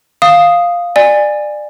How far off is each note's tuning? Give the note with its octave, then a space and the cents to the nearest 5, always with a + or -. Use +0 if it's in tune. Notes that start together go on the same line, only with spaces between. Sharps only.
F5 +0 D#6 +0
D5 +25 G#5 -15